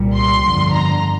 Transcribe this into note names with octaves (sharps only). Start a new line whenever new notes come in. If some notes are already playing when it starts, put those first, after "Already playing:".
Already playing: C2 A#2 G3
C6
G1 F2 D3
A#5